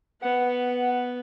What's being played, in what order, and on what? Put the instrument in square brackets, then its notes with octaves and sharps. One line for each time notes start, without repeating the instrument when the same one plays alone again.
[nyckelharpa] B3 B4 [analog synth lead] F#5